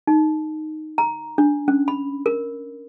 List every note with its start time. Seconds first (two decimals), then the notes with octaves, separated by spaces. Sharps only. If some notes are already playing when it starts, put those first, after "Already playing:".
0.07 D#4
0.98 A#5
1.38 D4
1.68 C#4
1.88 B5
2.26 A#4